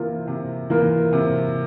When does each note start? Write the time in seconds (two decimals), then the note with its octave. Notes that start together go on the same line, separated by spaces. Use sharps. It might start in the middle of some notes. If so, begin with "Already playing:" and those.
Already playing: C3 E3 A#3 F4 A#4
0.27 C3
0.70 E3 A#3 F4 A#4
1.13 C3